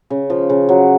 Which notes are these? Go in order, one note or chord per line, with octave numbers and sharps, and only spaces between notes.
C#3
F3
C#3
F#3